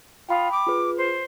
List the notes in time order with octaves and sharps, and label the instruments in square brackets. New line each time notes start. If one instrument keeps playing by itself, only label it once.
[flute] F4 [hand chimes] G5 B5 D#6
[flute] D6
[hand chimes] F4 G#4 B4
[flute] C5